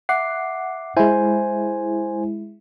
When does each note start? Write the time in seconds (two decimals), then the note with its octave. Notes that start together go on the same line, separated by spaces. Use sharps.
0.09 E5 F#5 D6 C7
0.97 G#3 E4 C5 G#5